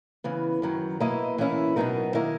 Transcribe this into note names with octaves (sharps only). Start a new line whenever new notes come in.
C#3 E3 B3
F#2 D#3 F#3
B2 A#3 E4 B4 D#5
E3 A#3 C#4 E4
B2 F#3 B3 D#4 A#4
D#3 A#3 E4 A#4 D#5